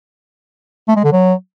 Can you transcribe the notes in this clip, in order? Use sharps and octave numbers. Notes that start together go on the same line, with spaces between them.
A3
G#3
D3
F#3